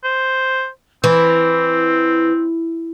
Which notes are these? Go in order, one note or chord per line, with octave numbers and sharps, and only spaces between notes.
C5
E3 C4